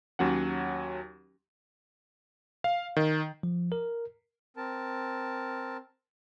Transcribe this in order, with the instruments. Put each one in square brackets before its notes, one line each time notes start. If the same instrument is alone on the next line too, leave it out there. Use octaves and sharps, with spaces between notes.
[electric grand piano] D#2 F#3 C#4 F#5
F5
D#3
[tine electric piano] F3
A#4
[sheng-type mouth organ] C4 A#4 A5